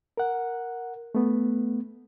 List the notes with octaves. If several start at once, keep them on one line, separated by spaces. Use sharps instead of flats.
A#4 F#5
A3 B3